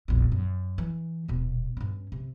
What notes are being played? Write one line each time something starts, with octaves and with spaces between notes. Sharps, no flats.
E1 A#1
F#2
E3
D#1 B2
G2 C#4
C3